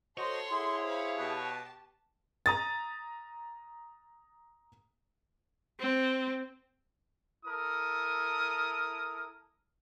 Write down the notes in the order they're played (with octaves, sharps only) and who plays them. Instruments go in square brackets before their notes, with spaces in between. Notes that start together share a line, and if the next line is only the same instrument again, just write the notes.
[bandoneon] F#4 C5 D#5 [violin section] A4 F#5 C6 [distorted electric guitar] C#5
[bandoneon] E4 G#4
[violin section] C5 F5 B5
[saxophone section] B2 [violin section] G4 A5
[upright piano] A#5 D#6 A6
[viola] C4
[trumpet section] E4 A4 A#4 D#6